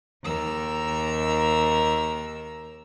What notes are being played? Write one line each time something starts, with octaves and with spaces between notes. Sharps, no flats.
D#2 A#4 E6